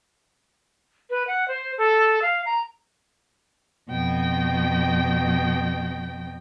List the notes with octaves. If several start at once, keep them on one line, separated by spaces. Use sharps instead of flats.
B4
F#5
C5
A4
F5
A#5
F2 B2 G5